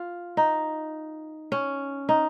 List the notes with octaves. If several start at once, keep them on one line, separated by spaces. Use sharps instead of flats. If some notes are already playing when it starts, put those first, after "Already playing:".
Already playing: F4
D#4
C#4
D#4